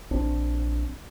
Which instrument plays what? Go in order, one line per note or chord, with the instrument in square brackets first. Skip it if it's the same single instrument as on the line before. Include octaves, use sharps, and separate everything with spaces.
[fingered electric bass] A#1 C4 D4